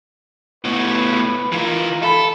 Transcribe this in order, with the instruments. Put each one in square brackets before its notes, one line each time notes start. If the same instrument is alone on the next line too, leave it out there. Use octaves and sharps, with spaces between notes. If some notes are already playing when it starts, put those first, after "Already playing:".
[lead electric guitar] A2 B3 [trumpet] B4
[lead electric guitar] E3 A#4 [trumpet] F4
[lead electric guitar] A4 [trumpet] B5